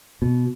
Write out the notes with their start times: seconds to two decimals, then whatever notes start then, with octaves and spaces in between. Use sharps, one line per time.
0.22 B2